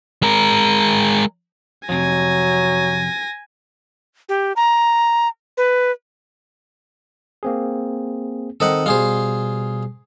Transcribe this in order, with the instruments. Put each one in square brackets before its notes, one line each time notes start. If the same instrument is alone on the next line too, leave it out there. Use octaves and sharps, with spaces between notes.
[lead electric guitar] G#3 A#4
[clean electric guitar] F2 C3 [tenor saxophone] F#3 [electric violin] G#5 A#6
[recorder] G4
A#5
B4
[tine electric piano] A#3 C4 G#4
[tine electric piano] D#3 C4 D#4 [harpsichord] A4 D#5 F#5
[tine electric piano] B2 G3 [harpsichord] F4 G#4 C5